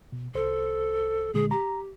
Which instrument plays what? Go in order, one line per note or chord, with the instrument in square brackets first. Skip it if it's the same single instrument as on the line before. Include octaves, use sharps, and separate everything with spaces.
[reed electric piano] B2
[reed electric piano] C2 C5 [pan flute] A4
[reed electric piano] A#2 D3 G#3 [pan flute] G#4
[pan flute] G4 [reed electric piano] A#5